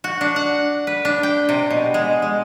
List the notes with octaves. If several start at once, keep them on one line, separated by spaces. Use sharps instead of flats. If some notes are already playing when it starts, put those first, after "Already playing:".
F#4
D4
F#5
B4
D4
G5
C3
B2
G#3
G#3